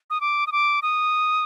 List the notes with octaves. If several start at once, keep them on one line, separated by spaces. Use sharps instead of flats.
D#6
D6
D#6
D6
D#6